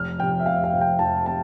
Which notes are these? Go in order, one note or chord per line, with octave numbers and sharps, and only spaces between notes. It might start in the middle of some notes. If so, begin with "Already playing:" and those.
Already playing: F1 F6
F2 C3 G5
E5
F1 F5
F5
F2 C3
G5
F1 A5
C3 A5